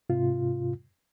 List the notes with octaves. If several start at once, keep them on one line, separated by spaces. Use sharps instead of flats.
G#2 C3 F4